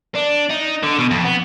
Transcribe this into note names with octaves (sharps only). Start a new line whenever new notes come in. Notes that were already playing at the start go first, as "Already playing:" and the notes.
D4
D#4
D3
B2
F2
B3